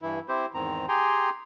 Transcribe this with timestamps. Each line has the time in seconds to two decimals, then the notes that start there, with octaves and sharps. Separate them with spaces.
0.02 G2 E3 E4
0.28 C4 E4 G4 C5
0.54 E2 G#2 D#3 C4 A#5
0.88 G4 G#4 G5 G#5 A#5 C6